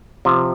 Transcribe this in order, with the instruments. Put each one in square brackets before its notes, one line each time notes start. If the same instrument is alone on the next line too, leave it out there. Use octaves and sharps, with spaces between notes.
[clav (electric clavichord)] C3 F3